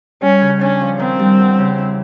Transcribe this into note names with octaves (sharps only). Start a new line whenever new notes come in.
G3 C#4
C#3
C#4 D4
F3
D#3 C4
G3
E2
C#3
E4